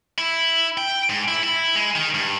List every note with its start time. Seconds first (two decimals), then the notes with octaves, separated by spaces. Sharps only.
0.18 E4
0.77 G5
1.10 G#2
1.28 E4
1.43 E4
1.75 G#3
1.95 D#3
2.14 G2